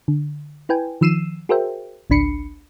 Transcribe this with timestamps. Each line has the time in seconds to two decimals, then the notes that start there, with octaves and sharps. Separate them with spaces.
0.08 D3
0.69 E4 B4 G5 G#5
1.01 D#3 F3 E6 C7 D#7 E7
1.49 F#4 G#4 A#4 C5 E5 G5
2.10 G#1 C#2 D4 B5 C7 C#7